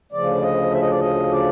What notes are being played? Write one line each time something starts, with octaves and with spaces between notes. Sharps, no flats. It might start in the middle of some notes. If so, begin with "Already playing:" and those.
D2 C#3 F3 D5
D#5
E5
D#5
D5
D#5
D5